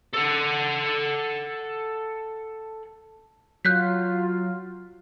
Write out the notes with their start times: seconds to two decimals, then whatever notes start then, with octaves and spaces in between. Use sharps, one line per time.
0.14 A4 F#5
3.65 F#3 F4 F#6 G6 B6